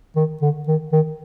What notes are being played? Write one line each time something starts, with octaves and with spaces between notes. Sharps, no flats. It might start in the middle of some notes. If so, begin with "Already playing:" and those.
D#3
D3
D#3
D#3